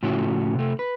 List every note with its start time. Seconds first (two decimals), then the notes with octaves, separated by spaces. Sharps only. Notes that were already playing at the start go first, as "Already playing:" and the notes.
0.03 A2 C#3 F3 C#4 E4 F#4
0.55 C3 A3
0.79 B4